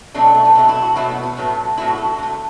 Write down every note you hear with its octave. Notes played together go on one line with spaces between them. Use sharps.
B2 F#3 A3 D4
A3
B3
B2 F#3 A3 E4
E4
F#4
B2 F#3 A3 E4
B3
B3
A2 F#3 A3
A2 F#3 A3 E4
F#4
A4
D3 A3